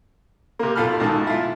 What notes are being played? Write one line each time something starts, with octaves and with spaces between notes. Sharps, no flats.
C3 A#3
B1 F4 A4 B5 F6
B1 G#2 D#3 A5
E4 F4